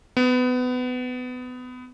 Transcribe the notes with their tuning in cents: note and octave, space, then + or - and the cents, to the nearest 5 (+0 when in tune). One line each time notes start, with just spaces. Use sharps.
B3 +25